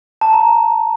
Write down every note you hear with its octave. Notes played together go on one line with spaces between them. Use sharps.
A5
A#5